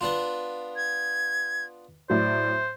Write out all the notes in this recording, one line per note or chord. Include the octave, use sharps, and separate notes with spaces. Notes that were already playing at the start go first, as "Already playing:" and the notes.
B3 D4 F4
G#6
A2 F#3 C5 D5